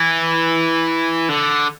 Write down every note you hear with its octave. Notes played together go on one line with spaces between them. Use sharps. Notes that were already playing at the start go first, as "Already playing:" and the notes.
Already playing: E3
D3